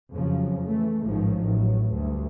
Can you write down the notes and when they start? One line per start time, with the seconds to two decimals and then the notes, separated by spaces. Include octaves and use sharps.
0.12 F2 C#3 F3 F#3
0.67 E3 A3
1.06 A1 G#2 D#3 F3 F#3
1.44 A1 A2 F#3
1.94 D2 G2